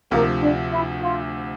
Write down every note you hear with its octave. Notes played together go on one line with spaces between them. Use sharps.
D2 C3 F3 A#3
D4
E4
F4